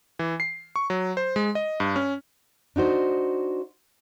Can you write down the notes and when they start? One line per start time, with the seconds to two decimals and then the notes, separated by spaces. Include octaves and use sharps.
0.19 E3
0.40 C7
0.76 C#6
0.90 F#3
1.17 C5
1.36 G#3
1.55 D#5
1.80 G2
1.96 C#4
2.76 D4 D#4 F#4 C5